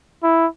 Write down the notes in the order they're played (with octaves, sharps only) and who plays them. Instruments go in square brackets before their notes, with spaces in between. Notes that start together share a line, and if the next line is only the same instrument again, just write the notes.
[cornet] E4